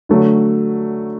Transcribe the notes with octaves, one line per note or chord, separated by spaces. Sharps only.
D3 F#3 A3